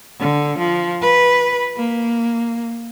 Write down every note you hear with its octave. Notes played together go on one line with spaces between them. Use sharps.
D3
F3
B4
A#3